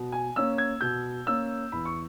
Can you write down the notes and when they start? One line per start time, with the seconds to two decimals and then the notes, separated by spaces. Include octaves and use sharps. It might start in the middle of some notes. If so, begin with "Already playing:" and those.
Already playing: B2
0.12 G#5
0.36 A#3 C#4 E6
0.58 G#6
0.81 B2 G6
1.27 A#3 C#4 E6
1.72 E2 B5
1.85 C#6